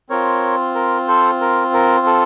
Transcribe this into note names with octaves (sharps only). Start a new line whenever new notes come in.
C4 F4 A#4 C#5
A#4
A4 C5
A#4
A#4
A4